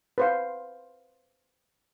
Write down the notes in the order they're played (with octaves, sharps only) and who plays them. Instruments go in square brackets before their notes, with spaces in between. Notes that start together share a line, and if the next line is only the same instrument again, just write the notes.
[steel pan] B4 C5 F5